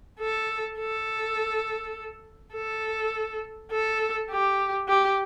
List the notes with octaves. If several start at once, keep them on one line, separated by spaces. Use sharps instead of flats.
A4
A4
A4
A4
G4
G4